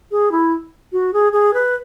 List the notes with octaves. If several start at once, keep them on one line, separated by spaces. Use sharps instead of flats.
G#4
E4
F#4
G#4
G#4
B4